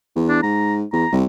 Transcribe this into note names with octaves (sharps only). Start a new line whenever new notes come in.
E2
D4
G#2 A#5
E2 A#5
C2